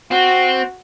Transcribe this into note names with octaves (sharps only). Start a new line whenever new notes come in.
C4 F#4